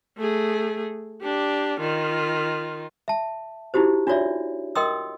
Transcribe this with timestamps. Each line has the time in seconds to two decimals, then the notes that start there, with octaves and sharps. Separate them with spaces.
0.18 A3 G#4
1.22 D4 G4
1.80 D#3 F4
3.08 E5 A5
3.74 D#4 E4 F#4 G4 C5
4.07 D4 F4 F#4 C#5 D5 E5
4.76 A#4 D#5 G5 C6 D#6 E6